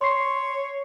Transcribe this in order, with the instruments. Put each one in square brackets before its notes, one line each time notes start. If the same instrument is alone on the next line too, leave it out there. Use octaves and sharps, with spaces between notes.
[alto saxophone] C#5 [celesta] C6 C#6 C7